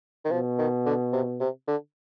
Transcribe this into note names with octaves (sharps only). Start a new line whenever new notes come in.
D#3
B2 F3
D#3
D3
C3
C3
D3